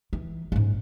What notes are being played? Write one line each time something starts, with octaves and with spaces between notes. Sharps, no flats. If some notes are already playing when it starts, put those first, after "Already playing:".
E3
G#2 C#4